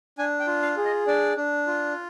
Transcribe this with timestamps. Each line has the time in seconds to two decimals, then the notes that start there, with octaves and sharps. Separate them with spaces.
0.18 D4 G#5
0.40 G5
0.47 F4
0.62 F5
0.77 G#4
0.85 D#5
1.07 D4 D5
1.37 D4
1.67 F4